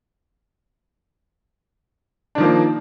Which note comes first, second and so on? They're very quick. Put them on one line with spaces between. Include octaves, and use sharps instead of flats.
D4 D#3 F3 A#3